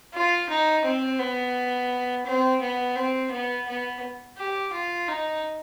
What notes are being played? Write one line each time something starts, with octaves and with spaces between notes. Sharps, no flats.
F4
D#4
C4
B3
C4
B3
C4
B3
B3
G4
F4
D#4